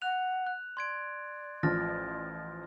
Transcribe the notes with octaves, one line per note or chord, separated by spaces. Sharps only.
F#5 F#6 F7
F#6
D5 C6 G#6 D7
A1 F3 F6 A6 A#6